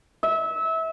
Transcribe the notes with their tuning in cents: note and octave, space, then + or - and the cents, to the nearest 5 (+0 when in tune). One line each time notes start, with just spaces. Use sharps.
E5 -25